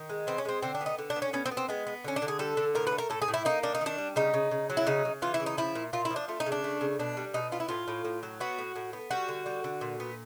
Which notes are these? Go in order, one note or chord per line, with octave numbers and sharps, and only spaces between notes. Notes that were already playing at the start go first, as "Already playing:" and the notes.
Already playing: D#3
G#3
B3 C4
C#4
G#3 C4
D3 C4
D4
B3
D#4
D3
D4
B3
C#4
B3 C#4
C4
B3
C4
G#3 B3
B3
D3 C#4
D4
D3
G#4
G3 A4
D3
A2 A#4
B4
A3
A#4
A2 A4
G#4
A2
E4
A#3 D#4
D#3 D4
D#4
D#3 D4
G3
C#3 D#4
C#3
C#3
F#3
E4
C#3 D#4
C#3
E3 F4
E4
C#3
D#4
F3 E4
A#2
A#2 F4
E4
F3
D4
A3 F4
D#4
C#3
D4
A3
C#3
B2 D4
G3
B2 D#4
B3 F4
E4
A2 F4
A2
A2
F#3
B3 F#4
A2
A2
B3
G3 F#4
D3
G3
D3
A#2
B3